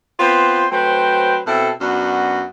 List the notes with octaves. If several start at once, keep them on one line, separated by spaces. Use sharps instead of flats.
B3 C4 F4 B4 C5
F#3 A3 C4 B4 C5 G5
B2 C4 E4 A4
F#2 B3 D4 F#4